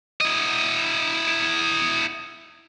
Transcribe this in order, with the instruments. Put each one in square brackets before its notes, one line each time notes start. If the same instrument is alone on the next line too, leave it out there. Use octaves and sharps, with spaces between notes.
[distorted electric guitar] E4 D#5